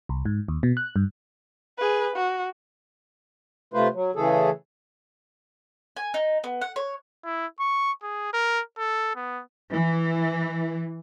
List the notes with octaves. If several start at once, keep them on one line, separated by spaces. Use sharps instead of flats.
C2
G#2
D#2
B2
F#6
G2
G#4 B4
F#4
C3 A3 F4 B4 C5
F#3
C#3 E3 A3 G#4 A4
G#5
D#4
B3
F#5
C#5
E4
C#6
G#4
A#4
A4
B3
E3